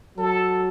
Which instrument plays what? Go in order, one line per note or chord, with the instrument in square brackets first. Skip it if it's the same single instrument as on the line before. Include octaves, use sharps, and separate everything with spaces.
[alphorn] F#3 [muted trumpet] A4